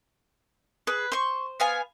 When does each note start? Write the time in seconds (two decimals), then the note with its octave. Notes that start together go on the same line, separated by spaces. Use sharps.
0.87 G#4 B4
1.12 C5 C6 C#6
1.60 B3 F5 G#5